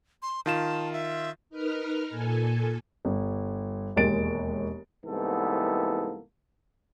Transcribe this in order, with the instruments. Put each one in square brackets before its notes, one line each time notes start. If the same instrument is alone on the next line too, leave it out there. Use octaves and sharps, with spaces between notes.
[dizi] C6
[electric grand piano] D#3 F4 E7 [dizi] A5
[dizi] E5
[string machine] D#4 A#4 B4 F6
A#2 A4 G#5
[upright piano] G1
E1 D#2 G#3 A6 D7
[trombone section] C2 G#2 E3 A#3 B3 A4